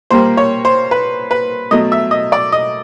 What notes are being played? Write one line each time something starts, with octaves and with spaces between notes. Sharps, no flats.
A#2 G3 A#3 C5
C#5
C5
B4
B4
B2 F#3 A3 D#5
E5
D#5
D5
D#5